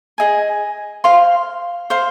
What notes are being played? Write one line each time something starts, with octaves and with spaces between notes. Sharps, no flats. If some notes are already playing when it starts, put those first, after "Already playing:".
G#4 D#5 G#5
C5 F5 C6
C5 F5 C6